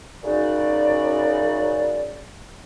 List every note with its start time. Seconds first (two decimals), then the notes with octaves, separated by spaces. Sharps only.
0.24 F#2 C#3 D#4 F#4 D5